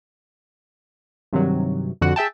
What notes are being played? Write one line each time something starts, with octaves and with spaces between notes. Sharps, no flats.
G2 C3 D#3 F#3
F2 D3 F#4 F#5
G#4 E5 G5 A5